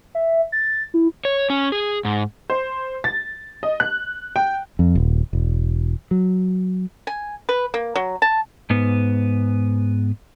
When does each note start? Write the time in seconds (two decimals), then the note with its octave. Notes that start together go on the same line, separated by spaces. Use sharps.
0.15 E5
0.52 A6
0.94 E4
1.25 C#5
1.50 C#4
1.72 G#4
2.05 G#2
2.50 C5
3.04 A6
3.63 D#5
3.80 F#6
4.36 G5
4.79 F2
4.95 D#1
5.33 E1
6.11 F#3
7.07 G#5
7.49 B4
7.74 A#3
7.96 F#3
8.22 A5
8.70 G#2 B3